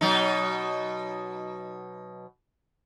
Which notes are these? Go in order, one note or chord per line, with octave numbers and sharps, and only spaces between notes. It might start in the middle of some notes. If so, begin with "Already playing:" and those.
B2 F#3 D#4